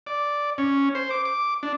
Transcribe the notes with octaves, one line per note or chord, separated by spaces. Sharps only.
D5
C#4
C5
D6
D6
D4